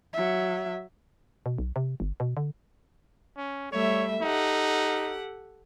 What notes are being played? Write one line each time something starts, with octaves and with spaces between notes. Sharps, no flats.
F#3 E5
B2
B1
C3
G1
B2
D3
C#4
G3 A3 C#5 E5
D#4 G4 A4 F#5